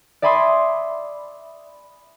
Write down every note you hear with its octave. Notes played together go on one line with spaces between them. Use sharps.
D5 E5 G#5 B5 C6 D#6